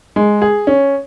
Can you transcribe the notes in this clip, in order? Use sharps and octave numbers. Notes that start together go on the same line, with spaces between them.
G#3
G#4
C#4